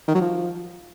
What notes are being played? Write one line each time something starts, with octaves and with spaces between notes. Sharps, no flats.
D#3
F#3
F3